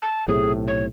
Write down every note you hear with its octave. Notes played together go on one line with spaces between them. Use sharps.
A5
B1 A2 C3 G#4
C#5